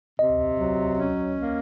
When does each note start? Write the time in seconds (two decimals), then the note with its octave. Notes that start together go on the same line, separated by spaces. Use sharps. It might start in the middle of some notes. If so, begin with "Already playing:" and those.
0.19 C3 D#5
0.59 F#3
0.98 C#4
1.38 A#3